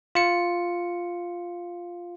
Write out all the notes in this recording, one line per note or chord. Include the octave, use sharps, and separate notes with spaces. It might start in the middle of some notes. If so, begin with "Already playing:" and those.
F4 C#7